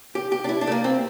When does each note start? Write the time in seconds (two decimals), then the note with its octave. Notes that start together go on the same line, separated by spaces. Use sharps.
0.15 G4
0.32 G4
0.44 D4
0.49 E4
0.61 D4
0.67 A3
0.72 A#3
0.84 C4